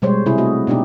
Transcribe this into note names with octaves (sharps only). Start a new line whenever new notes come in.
B2 G3 G#3 C5 C#5
C3 E4 G#4
A3 F#4 D#5
B2 B3 D4 D#4 G4